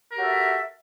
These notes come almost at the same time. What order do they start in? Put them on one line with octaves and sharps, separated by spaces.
A#4 G4 F#4 A4 E5